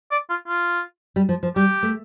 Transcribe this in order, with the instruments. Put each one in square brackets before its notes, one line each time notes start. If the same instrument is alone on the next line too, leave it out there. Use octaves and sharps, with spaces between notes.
[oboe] D5
F4
F4
[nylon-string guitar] G3
F3
F3
[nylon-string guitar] G3 [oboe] G4
[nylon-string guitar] A3